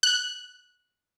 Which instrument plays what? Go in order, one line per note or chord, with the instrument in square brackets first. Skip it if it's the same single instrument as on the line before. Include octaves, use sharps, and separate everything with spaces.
[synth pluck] F#6